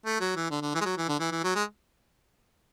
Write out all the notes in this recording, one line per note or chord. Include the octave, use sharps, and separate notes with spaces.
A3
F#3
E3
D3
D3
E3
G#3
F#3
E3
D3
E3
E3
F#3
G#3